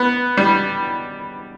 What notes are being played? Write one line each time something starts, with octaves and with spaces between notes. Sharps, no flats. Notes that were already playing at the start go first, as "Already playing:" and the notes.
Already playing: B3
G3